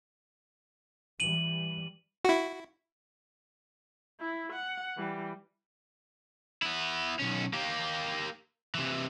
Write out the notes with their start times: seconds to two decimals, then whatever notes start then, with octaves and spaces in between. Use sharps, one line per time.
1.20 E3 G3 D#7 F#7
2.25 E4 F#4
4.20 E4
4.53 F#5
4.98 E3 G3
6.62 B3 E4
7.19 B1 C#4
7.53 A#3 G4
8.75 C3 E3